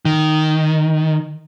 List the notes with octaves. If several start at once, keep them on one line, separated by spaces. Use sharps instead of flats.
D#3